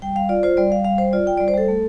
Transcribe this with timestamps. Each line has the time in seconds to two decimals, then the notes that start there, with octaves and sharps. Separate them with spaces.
0.02 G3 G5
0.15 G3 F5
0.29 F4 D5
0.43 F4 C5
0.57 G3 D5
0.71 G3 F5
0.85 G3 F5
0.98 G3 C5
1.13 F4 D5
1.27 F4 G5
1.37 G3 D5
1.48 C5
1.54 G3 A4
1.68 A3